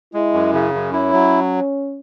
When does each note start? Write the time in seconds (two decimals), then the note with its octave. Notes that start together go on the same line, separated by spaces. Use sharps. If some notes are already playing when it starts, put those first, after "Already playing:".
0.14 G#3 E4
0.34 F#2
0.53 C#3
0.74 F#2
0.93 C#4 E4
1.13 F#3